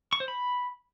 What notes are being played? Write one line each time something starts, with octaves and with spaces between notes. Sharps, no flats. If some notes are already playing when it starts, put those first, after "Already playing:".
C#6
C5
B5